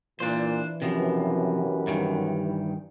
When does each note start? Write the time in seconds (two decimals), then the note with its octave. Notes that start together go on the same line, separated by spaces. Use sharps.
0.20 A#2 E3 D4 C5
0.82 B1 F#2 C3 F3 G4 B4
1.87 G2 D#3